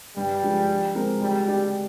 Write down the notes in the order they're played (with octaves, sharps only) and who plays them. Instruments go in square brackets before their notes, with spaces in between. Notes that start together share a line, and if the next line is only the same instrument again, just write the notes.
[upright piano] G2 [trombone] G3
[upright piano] F3 G#3 D4
F3
G#3 C4 D#4 A#4
[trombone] G3 [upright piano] G#3
[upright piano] D4 G4 D5